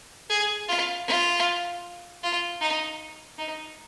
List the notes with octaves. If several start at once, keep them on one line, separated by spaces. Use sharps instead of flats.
G#4
F4
F4
F4
D#4
D#4